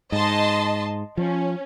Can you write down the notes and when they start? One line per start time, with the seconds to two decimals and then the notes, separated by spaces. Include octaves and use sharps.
0.12 G#2 D#5 A5 C6
1.17 F3 C#4